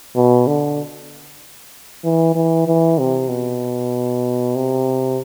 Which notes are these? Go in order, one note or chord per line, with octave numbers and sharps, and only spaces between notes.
B2
D3
E3
E3
E3
C3
B2
C3